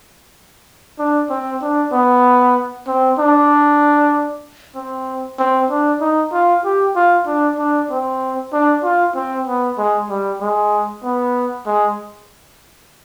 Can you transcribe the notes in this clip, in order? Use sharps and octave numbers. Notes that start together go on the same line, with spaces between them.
D4
C4
D4
B3
C4
D4
C4
C4
D4
D#4
F4
G4
F4
D4
D4
C4
D4
F4
C4
B3
G#3
G3
G#3
B3
G#3